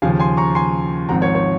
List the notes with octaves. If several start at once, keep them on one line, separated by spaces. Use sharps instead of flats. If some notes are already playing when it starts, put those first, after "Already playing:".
D#2 C#3 F3 F5 G#5
G#5 C6
A#5 C#6
G#5 C6
G#1 G#2 F3 C4 F#5 A#5
C#5
C#5